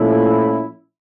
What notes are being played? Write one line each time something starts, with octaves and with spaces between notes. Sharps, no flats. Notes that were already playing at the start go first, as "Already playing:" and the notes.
Already playing: A#2 F3 A3 C#4 E4